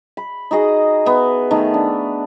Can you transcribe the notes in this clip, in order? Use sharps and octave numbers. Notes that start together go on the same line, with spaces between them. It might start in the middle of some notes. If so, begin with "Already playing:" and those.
B5
D#4 F#4 G#4 D#5
B3 E5
D#3 A3 B3 D#4
D4